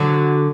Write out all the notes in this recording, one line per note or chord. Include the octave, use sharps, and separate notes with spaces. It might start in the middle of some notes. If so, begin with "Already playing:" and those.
Already playing: D3 F#3